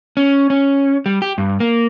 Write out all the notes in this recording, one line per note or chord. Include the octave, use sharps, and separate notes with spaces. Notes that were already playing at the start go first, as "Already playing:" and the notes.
C#4
C#4
G3
G4
G2
A#3